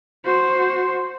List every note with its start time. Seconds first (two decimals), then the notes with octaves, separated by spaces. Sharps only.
0.25 F#4 C5